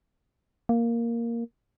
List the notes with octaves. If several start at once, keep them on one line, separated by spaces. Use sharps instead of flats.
A#3